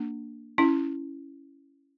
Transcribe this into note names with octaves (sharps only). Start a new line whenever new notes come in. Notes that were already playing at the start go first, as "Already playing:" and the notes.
Already playing: A#3 D4
C#4 E4